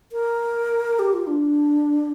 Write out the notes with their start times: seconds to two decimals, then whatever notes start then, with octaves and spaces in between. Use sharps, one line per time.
0.12 A#4
0.99 G4
1.13 F4
1.27 D4